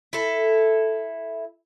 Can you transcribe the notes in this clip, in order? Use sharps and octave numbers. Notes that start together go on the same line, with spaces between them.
E4 A4